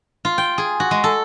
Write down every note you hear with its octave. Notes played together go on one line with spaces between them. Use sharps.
F4
G5
G#4
F#4
G#3
A4